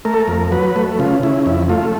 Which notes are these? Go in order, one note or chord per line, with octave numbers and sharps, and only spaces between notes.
A3 A#4
A4
A#4
F2
F#3 B4
A3
C#3 F4
C#3 E4
F2 E4
A3 F4